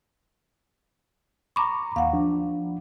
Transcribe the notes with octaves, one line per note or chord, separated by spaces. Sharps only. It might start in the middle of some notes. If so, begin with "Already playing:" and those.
A#5 B5 C#6 D6
D#2 F5 F#5
F3 D4